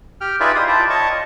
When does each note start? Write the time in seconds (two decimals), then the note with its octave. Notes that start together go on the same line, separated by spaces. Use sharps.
0.21 G4 G5 F6
0.40 D#4 F4 G#4 B4 D5 E5
0.55 E4 F4 G#4 C5 C6 D#6
0.68 E4 F4 D5 G5 A5
0.90 C#5 D#5 A5 C#6
1.11 F4